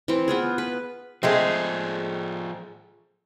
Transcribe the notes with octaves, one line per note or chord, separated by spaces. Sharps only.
E3 C4
B3 F4 G#4
B4
F3 G#3 A3 C4 G#4